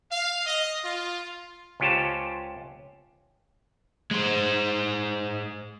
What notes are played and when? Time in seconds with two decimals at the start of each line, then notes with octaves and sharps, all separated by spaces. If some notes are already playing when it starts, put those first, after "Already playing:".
0.11 F5
0.45 D#5
0.83 F4
1.80 C#2 C#4 F4 G4 C5 A5
4.11 G#3 C5